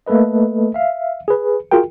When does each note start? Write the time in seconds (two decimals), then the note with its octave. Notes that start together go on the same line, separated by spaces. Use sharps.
0.06 A3 A#3 A4 B4 D#5
0.74 E5 F5
1.28 G#4 B4
1.71 F4 F#4 G#4 A#4 G5